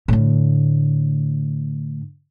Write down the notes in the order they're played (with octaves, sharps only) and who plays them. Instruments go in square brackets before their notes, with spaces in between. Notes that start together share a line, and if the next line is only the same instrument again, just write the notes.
[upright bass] A2 D3